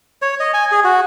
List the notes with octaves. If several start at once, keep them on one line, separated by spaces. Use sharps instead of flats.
C#5
D#5
G#5
G#4
F#4